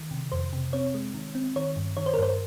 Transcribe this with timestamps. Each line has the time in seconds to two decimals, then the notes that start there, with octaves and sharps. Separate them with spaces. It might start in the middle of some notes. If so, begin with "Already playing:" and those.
Already playing: D#3
0.11 C3
0.32 F2 C5
0.53 C3
0.73 C4 C#5
0.94 G#3
1.14 D#3
1.35 C4
1.56 D#3 C#5
1.76 G2
1.97 D#3 C#5
2.06 C5
2.14 A#4
2.18 G2 C5